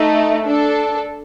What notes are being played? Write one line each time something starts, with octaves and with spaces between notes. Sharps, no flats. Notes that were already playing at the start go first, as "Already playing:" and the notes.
Already playing: A3 D#4 A4
D4 A4